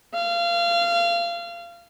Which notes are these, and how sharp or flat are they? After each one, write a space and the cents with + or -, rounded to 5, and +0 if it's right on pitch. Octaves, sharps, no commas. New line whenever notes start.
F5 -25